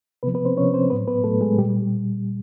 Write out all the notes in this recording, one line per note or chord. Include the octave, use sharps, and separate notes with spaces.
C3 F3 B3 B4
B3 B4
C4 C5
C3 F3 C#4 C#5
C4 C5
A2 F#3 B3 B4
B3 B4
A2 F#3 A3 A4
G#3 G#4
A#2 G3 G4